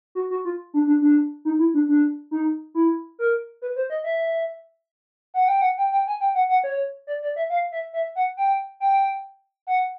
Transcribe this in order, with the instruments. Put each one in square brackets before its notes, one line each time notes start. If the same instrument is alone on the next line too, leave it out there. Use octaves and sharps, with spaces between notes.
[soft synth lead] F#4
F#4
F4
D4
D4
D4
D#4
E4
D4
D4
D#4
E4
A#4
B4
C5
D#5
E5
F#5
G5
F#5
G5
G5
G#5
G5
F#5
F#5
C#5
D5
D5
E5
F5
E5
E5
F#5
G5
G5
F#5